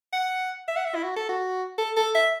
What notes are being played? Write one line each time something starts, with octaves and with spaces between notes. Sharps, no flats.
F#5
E5
F#5
E5
E4
F#4
A4
F#4
A4
A4
E5